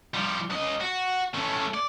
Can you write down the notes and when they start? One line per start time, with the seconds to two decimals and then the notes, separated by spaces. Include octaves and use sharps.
0.14 F3 G3
0.50 C#2 D#5
0.81 F#4
1.34 A3 C#4
1.74 D5